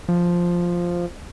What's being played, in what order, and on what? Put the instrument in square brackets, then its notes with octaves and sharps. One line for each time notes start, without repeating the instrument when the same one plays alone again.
[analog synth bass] F3